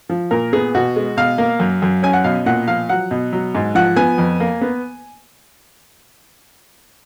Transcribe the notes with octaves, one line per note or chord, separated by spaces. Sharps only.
F3
A#2 A#4
B3 G#4
B2 F#4
G#3
B2 F5
A#3
F#2
F#2
C#4 G#5
F#5
B2 F5
A#2 F#5
F3 F5
F#3 F#5
B2
F#3
G#2
F3 F#5
B3 G#5
F2
A#3
B3